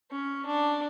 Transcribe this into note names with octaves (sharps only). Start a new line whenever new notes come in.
C#4
D4